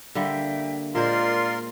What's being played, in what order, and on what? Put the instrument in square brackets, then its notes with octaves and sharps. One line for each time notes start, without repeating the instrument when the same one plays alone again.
[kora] D3 G3 A#3 [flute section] E5 G5
[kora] A#2 G#3 C5 [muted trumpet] F4 [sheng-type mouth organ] A#4 C6 [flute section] D5